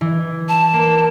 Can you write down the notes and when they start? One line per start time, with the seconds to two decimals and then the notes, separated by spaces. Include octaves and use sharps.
0.01 E3
0.49 A5
0.74 A#3